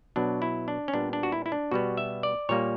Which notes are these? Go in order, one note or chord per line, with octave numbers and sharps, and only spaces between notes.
B2 F#3 B3 D4
E4
D4
C#4
A#2 G3 B3 D4
D4
F#4
E4
E4
D4
B2 G3 B3 F#4
E5
D5
A#2 G3 A#3 C#5